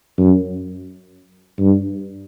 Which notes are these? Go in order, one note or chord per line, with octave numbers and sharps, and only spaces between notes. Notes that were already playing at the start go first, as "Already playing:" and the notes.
F#2
G2